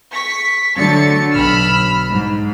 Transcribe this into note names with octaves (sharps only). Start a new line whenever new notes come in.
C#6 B6
D3 F#3 A3 A6 C#7
B1 B5 E6 F6
G#2